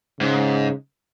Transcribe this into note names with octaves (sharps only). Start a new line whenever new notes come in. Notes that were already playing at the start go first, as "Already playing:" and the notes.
G#2 C#3